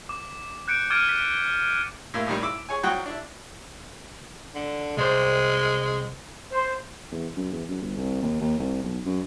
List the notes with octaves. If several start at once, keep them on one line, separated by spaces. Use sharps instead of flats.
D6
F#6 G6 C#7 D7
D6 F6 G#6 A6 D7 D#7
B6
A2 A#3 E4
A2 C3 D#3 G3
E4 B5 D6 E6
G#4 C#5 G#5
C2 F#3 F#5 G5 C#6 D#6
D4 E4
D3
C2 G#3 C5
C5
E2
F#2
E2
F#2
G1
C2
D#2
D#2
C2
B1
F#2